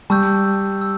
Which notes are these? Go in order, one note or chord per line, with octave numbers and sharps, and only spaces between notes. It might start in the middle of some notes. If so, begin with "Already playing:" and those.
G3 A5 C#6 E6 G6
E6